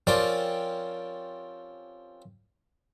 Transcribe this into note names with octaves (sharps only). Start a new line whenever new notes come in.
F3 C4 C#4 G4 A#4 D5